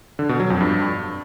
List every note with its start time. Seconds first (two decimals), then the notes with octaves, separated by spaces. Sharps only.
0.19 D3
0.29 B2
0.40 F#3
0.50 F2
0.61 G2